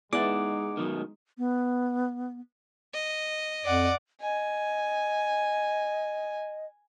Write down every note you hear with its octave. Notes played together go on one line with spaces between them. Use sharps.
G#3 B3 D#4 E4 G#4 D5 F#5 D6
F#2 B2 D#3
B3
D#5
F2 D5 F#5
D#5 G#5